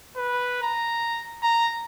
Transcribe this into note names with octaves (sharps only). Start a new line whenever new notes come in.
B4
A#5
A#5